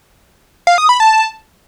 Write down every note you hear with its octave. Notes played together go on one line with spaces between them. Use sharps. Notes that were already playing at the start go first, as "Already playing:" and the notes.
F5
D#6
B5
A5